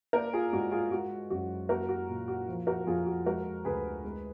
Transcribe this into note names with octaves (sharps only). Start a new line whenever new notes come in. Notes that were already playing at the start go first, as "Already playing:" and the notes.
A#3 A#4 D5
F4 G#4
G#2 F#4
F4 G#4
G#3 F#4
F#2 F#4
A#3 F#4 A#4
F#4
A#2
F#4
F3
F#4 A#4
F2 F4 G#4
F#4
G#3 F#4 A#4
D2 G#4 B4
G#3